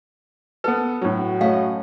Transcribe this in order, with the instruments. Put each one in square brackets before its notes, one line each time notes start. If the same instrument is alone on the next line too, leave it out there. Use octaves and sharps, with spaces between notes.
[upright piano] B3 A4 [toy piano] B4
[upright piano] A2 F#3 [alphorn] F#4
[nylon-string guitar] F#2 A3 D#5 [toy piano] F5